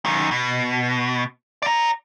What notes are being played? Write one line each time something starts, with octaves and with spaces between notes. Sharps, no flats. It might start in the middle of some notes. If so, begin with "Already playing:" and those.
F#2 D#3
B2
D5 A#5